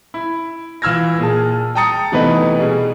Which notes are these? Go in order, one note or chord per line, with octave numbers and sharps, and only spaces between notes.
E4
E3 F4 E6 F6 G#6 A#6
A#2 G#4 A5
G5 A5 A#5 D#6 A6 C#7
C3 E3 A3 B3 D#4 B4
B2 G3 G#4